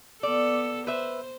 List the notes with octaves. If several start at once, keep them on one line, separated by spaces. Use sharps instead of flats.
B3 A4 D5
B4 C5 E5